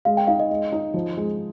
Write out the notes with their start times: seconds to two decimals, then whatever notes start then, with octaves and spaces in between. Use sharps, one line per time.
0.05 G#3 F5
0.17 G5
0.27 D#4 F5
0.40 D#5
0.51 G#3
0.72 D#4
0.94 F3
1.17 G#3